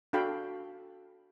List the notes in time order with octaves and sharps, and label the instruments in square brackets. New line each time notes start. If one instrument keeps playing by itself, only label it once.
[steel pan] D4 F#4 A4 F5 G5 B5